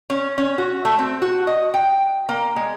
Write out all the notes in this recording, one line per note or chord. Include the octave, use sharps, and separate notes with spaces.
C#4
C#4
F#4
A3
C4
F#4
D#5
G5
A#3
G#3